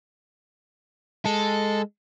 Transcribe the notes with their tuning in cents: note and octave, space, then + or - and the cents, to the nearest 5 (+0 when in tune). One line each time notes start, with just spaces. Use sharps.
G#3 +0 A4 +0